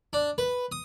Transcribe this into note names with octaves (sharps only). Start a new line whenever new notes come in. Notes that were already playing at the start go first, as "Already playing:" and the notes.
D4
B4
D#6